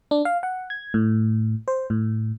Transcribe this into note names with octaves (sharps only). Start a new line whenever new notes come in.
D4
F5
F#5
G#6
A2
C5
A2